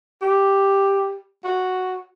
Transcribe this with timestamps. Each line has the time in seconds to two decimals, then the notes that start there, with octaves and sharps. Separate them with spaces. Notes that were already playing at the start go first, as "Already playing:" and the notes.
0.22 G4
1.44 F#4